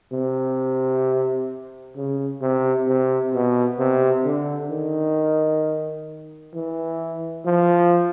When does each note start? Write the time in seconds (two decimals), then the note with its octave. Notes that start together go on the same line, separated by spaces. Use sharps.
0.13 C3
1.96 C#3
2.42 C3
2.87 C3
3.33 B2
3.79 C3
4.25 D3
4.71 D#3
6.54 E3
7.45 F3